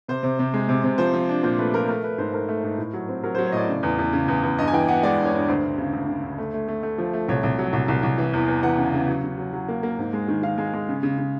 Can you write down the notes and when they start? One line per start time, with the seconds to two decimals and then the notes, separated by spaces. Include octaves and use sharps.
0.08 C3 C5
0.23 C3
0.39 C3
0.54 G#3
0.69 C3
0.84 C3
0.98 F3 C5
1.13 F3
1.29 D4
1.43 A#2 C5
1.58 A3 B4
1.74 F3 A#4
1.89 A3 A#4
2.03 A3 B4
2.18 G#2 C5
2.33 A3 A#4
2.49 A3
2.64 G#2
2.78 A2
2.93 F#3
3.08 C4
3.24 F#3 A#4
3.35 F#3 C5
3.46 C#5
3.52 A2 D5 D#5
3.69 C#3
3.83 E2
3.99 E2
4.13 C#3
4.28 E2
4.43 E2
4.58 G2 D#5
4.67 G#5
4.73 E3 G5
4.88 B3 F#5
5.03 G#3 D5
5.18 G2
5.25 C#5
5.33 G2
5.48 D2 C5
5.64 D2
5.78 C#3
5.93 D2
6.08 C#3
6.23 D2
6.38 A3
6.54 A3
6.68 A3
6.83 A3
6.98 F3
7.13 A3
7.28 C2 C#5
7.43 C2
7.58 F#3
7.73 C2
7.88 C2
8.03 C2
8.18 E3
8.33 E2
8.48 E2
8.63 E3 F#5
8.78 C#3
8.94 C#3
9.08 F#3
9.23 C#3
9.38 F#3
9.53 F#3
9.68 A#3
9.83 A#3
9.98 G#2
10.13 G#3
10.28 D#3
10.43 D#3 F5
10.58 G#3
10.73 G#3
10.89 C#3
11.03 C#3
11.18 C#3